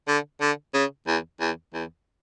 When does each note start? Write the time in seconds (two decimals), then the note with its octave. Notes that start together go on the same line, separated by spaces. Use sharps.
0.08 D3
0.41 D3
0.74 C#3
1.07 E2
1.40 E2
1.74 E2